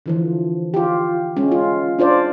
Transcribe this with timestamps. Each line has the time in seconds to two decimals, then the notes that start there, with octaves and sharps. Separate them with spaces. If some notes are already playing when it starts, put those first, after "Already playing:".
0.06 D3 E3 F3
0.74 F4 G4
1.37 G#3 C#4
1.52 F4
1.99 D4 F4 C5 D5